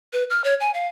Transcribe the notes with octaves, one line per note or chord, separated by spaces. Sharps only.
B4
F6
C#5
G#5
F5